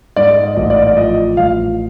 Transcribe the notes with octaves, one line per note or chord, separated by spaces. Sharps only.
G#2 D5
D#5
D5
A1 D#5
D5
D5
F3 D#5
A1 F5